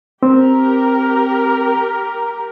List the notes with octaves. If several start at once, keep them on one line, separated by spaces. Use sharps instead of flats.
C4 G4 A#4